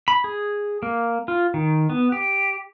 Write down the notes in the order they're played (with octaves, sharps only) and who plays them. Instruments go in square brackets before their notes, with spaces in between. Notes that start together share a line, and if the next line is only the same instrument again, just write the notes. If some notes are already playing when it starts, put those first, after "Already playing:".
[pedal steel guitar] B5
G#4
A#3
F4
D#3
B3
G4